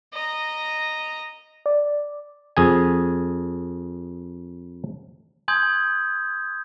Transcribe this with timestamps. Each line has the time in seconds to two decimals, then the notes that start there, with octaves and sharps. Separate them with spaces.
0.13 D#5 A#5
1.66 D5
2.57 F2 G#4 G#5
5.48 G#5 C6 D#6 G6 G#6